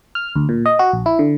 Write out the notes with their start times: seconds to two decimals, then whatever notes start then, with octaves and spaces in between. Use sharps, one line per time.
0.15 F6
0.36 D2
0.49 A#2
0.66 D#5
0.79 F#4
0.93 A#1
1.06 E4
1.19 D3